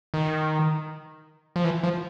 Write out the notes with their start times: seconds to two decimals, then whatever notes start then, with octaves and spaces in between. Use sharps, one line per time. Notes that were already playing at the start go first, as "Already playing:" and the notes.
0.14 D#3
1.56 F3
1.65 E3
1.83 F3